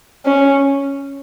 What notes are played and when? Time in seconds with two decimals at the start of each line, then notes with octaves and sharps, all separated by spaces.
0.25 C#4